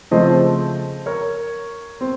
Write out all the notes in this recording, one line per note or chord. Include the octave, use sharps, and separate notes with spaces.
C#3 F3 A3 C4 C5 D#5
A#4 C#5
C4